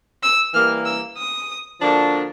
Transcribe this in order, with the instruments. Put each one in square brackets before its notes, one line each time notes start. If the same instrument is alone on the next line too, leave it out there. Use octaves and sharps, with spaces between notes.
[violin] E6
[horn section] E3 G3 A#3 [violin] F6
[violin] E6
D#6
[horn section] D3 F3 A#3 D4 F#4